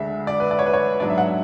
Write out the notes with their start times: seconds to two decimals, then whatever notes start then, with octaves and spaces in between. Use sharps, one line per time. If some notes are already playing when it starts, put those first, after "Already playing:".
Already playing: D2 D3 G#3 E5
0.27 D5
0.40 B4
0.51 D5
0.59 C#5
0.66 B4
0.73 C#5
1.00 G#2 F#3 B3 D4 D5
1.10 E5
1.18 F#5
1.28 E5